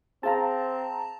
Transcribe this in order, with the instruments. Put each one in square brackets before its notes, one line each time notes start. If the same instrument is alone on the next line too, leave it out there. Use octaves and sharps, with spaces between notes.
[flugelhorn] C4 [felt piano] G#4 F5 [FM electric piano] A5 A#5